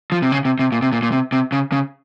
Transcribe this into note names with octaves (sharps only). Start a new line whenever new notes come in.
F3
C3
C#3
C3
C3
A#2
C3
A#2
A#2
C3
C3
C#3
C#3